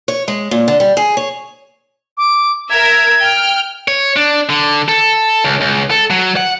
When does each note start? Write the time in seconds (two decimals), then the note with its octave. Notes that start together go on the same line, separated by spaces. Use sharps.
0.08 C#5
0.28 G#3
0.51 A#2
0.68 D3
0.80 G3
0.97 G#4
1.17 C#5
2.18 D6
2.70 A#4 E5 G#6
3.19 G5 F6
3.88 C#5
4.16 D4
4.49 D3
4.88 A4
5.44 C#2
5.61 C#2
5.91 A4
6.10 F#3
6.36 F#5